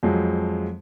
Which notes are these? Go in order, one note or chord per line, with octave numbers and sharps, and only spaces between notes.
F2 F3 F#3 G#3